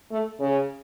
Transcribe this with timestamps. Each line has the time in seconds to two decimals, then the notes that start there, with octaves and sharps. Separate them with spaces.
0.11 A3
0.39 C#3